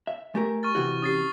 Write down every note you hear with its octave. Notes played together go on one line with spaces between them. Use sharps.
E5
A3 G4 A#4 G#5
C#6 F6 A6
C3 E3 E4 F#4 G4
C#4 G4 D#6 A6 C7